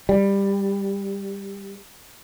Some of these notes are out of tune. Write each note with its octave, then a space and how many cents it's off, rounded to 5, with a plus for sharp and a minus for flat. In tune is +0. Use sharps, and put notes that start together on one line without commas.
G3 +15